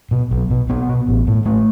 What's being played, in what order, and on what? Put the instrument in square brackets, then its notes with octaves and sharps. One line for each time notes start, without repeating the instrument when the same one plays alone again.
[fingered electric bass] B2
B1
B2
B1 B3
B2
A1
A2
A1 A3